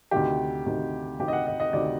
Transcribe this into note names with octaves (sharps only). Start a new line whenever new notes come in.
D2 C3 D#3 G4
D2 C3 D#3
D2 C3 D#3 G4
D#5
F#5
D#5
D#5
D2 C3 D#3 D5